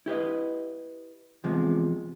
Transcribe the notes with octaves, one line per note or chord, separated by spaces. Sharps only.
E4 G4 B4 D#5
E2 C3 F3 G#3